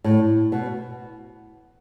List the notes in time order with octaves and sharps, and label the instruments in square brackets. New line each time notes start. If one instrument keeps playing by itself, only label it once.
[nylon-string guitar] A2
B2